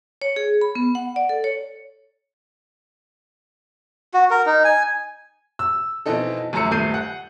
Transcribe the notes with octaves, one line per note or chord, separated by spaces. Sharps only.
C#5
G#4
B5
B3
F#5
D5
A4
C#5
F#4
A#4
D#4
G#5
E6
B2 E3 C4 D#4 A4
G1 F#2 A3 A#5 E6 C#7
D#1 G2 A3 G6 C7 D#7
F#5